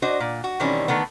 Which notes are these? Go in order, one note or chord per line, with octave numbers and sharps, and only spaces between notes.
D4 F#4 C5 D#5
A#2
F#4
B2 D#3 E3 G3 C4 C#4
D3 D#3 A3 B3